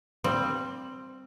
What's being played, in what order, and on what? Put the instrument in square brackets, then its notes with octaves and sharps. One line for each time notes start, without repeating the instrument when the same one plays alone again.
[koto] G3 C4